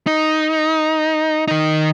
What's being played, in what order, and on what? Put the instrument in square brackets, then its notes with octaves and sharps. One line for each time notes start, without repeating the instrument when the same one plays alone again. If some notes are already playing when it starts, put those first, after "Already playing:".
[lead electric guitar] D#4
D#3 D#4